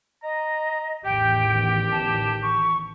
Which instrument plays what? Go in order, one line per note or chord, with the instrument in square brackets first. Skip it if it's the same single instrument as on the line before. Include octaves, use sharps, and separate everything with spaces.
[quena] D#5 [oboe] A#5
[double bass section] A1 E2 D#3 [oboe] G4 [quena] G5
[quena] A5
C#6